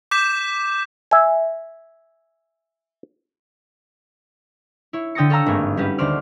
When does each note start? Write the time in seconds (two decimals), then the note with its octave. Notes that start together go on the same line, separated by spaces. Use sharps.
0.11 D6 G6 B6 E7
1.11 E5 G#5
4.93 E4 C#5
5.15 D3 G5 D#6 A6 A#6 C#7
5.30 A4 C#5 F5 A#5 E6
5.46 G#1 G2 A3 A#3 G#5
5.77 G3 C#4 F#4 G4 B4
5.98 D#1 D2 F#4 C5 D5 F6